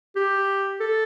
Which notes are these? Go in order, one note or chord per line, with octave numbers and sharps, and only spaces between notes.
G4
A4